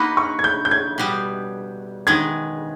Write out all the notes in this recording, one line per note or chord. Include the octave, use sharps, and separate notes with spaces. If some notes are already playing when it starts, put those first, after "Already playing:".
Already playing: A#3 D#4 F#4 B4 B5
C#6
G#6
G6
G6
G#6
B2 G3 B3
D#3 G#3 B3 G#6